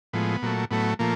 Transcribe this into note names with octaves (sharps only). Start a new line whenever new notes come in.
A2 F3 G#3 B3
A#2 F#3 A3
A2 F#3 A3 B3
A#2 F3 A3 A#3